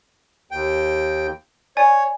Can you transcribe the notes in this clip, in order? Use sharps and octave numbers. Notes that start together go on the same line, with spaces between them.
D#2 G5
C#5 D5 G#5